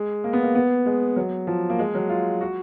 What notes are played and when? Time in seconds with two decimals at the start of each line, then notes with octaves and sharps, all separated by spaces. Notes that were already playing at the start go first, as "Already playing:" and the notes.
Already playing: G#3
0.24 A#3
0.33 B3
0.43 A#3
0.55 B3
0.86 G#3
1.16 F#3
1.47 F3
1.70 A#3
1.79 G#3
1.95 F#3
2.09 F4
2.41 F#4